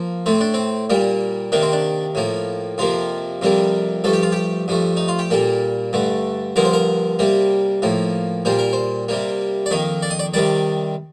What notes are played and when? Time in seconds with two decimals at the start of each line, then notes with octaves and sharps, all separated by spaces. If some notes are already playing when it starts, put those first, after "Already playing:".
Already playing: F3 A#3
0.26 A2 A3 C4
0.41 D4
0.54 C4
0.90 A#2 G3 A#3
1.52 C3 D#3 A#3 D4
1.62 C4
1.73 D4
2.15 A2 F3 A#3
2.78 F2 C3 F3 A#3 F4
3.42 F2 C3 G3 A#3
4.04 G2 F3 A3 A4
4.13 G4
4.23 F4
4.32 G4
4.68 G2 F3 A3
4.97 D#4
5.08 F4
5.19 G4
5.30 A#2 G3 A#3 A4
5.93 G2 D3 A3
6.56 G2 D3 F3 A#3 A#4
6.65 C5
6.73 A#4
7.19 C3 G3 A#3
7.82 A2 F3 A#3
8.45 A#2 G3 A#3 C5
8.59 A#4
8.73 C5
9.09 C3 G3 A#3
9.66 D5
9.71 F2 D#3 A#3 D#5
10.02 D5
10.11 D#5
10.19 D5
10.34 C3 D#3 G3 D5